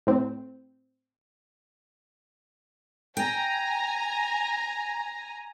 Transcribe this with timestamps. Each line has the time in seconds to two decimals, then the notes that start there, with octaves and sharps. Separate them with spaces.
0.07 A2 C4
3.17 G5 G#5 A#5